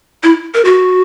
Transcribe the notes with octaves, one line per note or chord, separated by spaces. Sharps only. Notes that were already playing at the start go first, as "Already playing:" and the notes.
E4
A#4
F#4